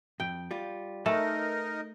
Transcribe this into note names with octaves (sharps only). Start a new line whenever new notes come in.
F2 G5
G3 F4
A3 D#4 A#4 B4 D#5 G#5 A5